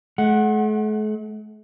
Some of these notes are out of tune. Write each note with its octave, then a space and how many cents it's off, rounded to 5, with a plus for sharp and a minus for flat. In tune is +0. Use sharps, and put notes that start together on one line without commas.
A3 -45 F#5 +0